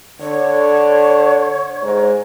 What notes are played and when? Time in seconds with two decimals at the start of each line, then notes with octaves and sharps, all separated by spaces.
0.21 D3 C#5
1.82 G#2